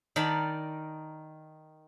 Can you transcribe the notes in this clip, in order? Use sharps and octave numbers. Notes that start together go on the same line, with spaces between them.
D#3 A#4 D5 G5 A5 B5